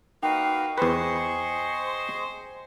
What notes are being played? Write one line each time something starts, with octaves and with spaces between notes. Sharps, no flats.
A#3 D#4 F#4 B4 F5 G5
E2 G#4 B4 C5 D#5 C#6